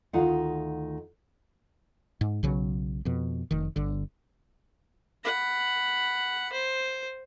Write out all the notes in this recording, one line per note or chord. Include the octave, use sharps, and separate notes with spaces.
D2 D#3 D#4 F4 F5 F#5
G#2
B1 C#3 F#3
F2 B2
F1 D#3
G1 D3
F#5 B5
C5